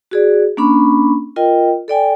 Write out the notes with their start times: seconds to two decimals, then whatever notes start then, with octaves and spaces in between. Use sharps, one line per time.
0.11 F#4 G#4 D5
0.57 A#3 C#4 D4 B5 C#6
1.36 F4 A#4 D#5 G5
1.88 A4 D5 G5 G#5